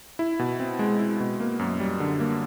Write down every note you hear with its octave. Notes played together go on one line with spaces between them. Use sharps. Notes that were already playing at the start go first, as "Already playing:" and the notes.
E4
B2
C4
G#3
E4
B2
A#3
F#2
G3
D3
A#3